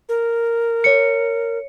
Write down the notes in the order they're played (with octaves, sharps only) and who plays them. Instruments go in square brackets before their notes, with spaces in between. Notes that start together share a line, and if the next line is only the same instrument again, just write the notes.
[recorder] A#4
[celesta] C#5 C#7